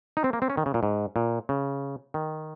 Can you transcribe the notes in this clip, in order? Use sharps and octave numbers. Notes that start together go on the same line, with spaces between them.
D#4
C4
A#3
C4
C#4
D#3
C#3
A#2
G#2
A#2
C#3
D#3